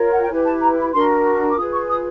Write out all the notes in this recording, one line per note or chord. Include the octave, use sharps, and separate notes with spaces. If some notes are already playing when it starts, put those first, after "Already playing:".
Already playing: F4 A#4 C#5
F#5
G5
E4 G4 B4 G#5
A5
A#5
B5
D4 F#4 A#4 C6
C#6
D6
F4 G#4 B4 D#6
C#6
D#6